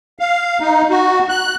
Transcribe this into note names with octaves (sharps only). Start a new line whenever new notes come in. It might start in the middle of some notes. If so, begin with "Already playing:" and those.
F5
D#4
F#4
F#6